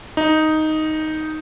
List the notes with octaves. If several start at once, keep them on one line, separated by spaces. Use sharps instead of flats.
D#4